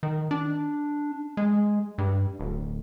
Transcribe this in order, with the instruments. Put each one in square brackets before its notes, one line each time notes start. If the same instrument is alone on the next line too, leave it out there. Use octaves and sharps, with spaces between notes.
[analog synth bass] D#3
D4
G#3
G2
D1